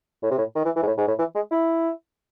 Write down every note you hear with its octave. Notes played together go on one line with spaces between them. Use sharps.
A2
C3
A2
D#3
E3
E3
G#2
A2
G#2
A2
E3
G#3
E4